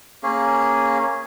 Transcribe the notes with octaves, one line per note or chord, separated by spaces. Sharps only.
A#3 C#4 G#4